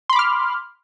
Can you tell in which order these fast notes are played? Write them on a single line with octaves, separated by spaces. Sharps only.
C6 B5 D6 F6